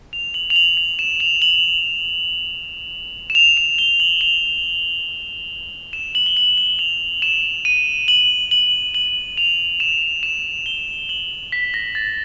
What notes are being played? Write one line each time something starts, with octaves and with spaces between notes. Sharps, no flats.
F7
F#7
F7
F#7
F7
E7
F7
F#7
E7
F7
E7
G7
F#7
F7
E7
F#7
G7
F#7
F#7
F7
E7
D#7
F#7
F#7
F#7
F7
E7
E7
G7
F#7
B6
A#6
A6